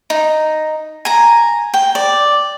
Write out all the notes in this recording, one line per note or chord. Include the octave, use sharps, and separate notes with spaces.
D#4
G#5 A#5
G5
D5